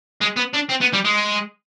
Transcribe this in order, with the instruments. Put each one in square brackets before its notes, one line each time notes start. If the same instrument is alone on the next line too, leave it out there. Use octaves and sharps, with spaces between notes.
[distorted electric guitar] G#3
B3
D4
C4
B3
G3
G#3